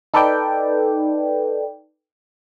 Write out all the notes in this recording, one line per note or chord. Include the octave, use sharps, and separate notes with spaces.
D#4 A4 B4 D5 G5